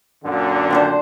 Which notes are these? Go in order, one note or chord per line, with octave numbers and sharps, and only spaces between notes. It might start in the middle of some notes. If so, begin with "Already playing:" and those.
F#2 A#2 D3
C4 D4 C5